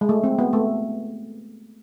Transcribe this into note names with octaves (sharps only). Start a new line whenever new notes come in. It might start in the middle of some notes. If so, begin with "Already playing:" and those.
G#3
A3
C4
B3
A3